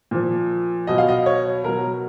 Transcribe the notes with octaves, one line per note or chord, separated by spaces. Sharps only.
A#2 F3
B2 F#3 D#5
F5
D#5
C#5
B2 F#3 A#4